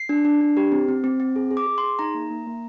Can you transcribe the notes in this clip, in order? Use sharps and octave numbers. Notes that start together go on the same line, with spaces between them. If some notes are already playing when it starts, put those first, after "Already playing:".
Already playing: C7
D4
D4
D4
G4
C4
C4
C4
C4
G#4
G#4
D6
G#4
C6
G#4
D#4 A#5
A#3
A#3
A#3